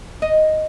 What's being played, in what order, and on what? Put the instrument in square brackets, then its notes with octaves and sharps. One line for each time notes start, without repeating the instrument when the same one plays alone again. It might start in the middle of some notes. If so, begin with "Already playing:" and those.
[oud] D#5